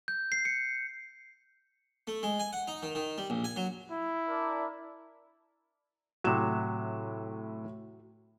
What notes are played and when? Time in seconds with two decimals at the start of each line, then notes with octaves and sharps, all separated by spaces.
0.08 G6
0.32 C7
0.45 C#7
2.07 A3
2.23 G#3
2.40 G#5
2.53 F#5
2.68 D#4
2.83 D#3
2.95 D#3
3.18 G3
3.30 A#1
3.44 G#5
3.56 F#3
3.91 E4
4.29 D4 A#4 D5
6.24 A2 C3 F#3 F#4 E7